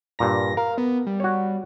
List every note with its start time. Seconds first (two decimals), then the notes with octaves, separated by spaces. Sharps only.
0.19 G2 A#2 A#5 A#6
0.57 A#4 F5
0.78 B3
1.07 G3
1.20 F#4 C#5